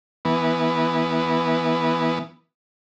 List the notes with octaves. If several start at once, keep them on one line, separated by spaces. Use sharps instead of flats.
E3 B3